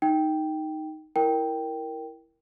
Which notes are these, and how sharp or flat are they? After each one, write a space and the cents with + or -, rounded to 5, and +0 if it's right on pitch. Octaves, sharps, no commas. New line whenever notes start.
D#4 +0 G5 +0
E4 +0 A#4 +0 G5 +0